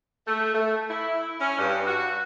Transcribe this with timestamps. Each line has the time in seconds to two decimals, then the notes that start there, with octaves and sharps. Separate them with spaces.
0.27 A3
0.54 A3
0.90 E4
1.40 C#4
1.58 G2
1.87 F#4